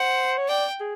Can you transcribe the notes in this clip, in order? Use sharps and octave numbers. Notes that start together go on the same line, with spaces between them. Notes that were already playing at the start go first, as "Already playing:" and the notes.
Already playing: C5 F#5
C#5
D5 G5
G#4